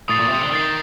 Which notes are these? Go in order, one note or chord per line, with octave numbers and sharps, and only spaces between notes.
A2 D#6 A6 C7
A#2
C3
D3
D#3 D#6 A6 C7